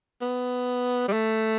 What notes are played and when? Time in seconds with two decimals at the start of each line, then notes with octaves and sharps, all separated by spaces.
0.22 B3
1.08 G3
1.13 A3